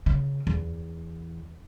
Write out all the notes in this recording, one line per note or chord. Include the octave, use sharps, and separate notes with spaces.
C#3
E2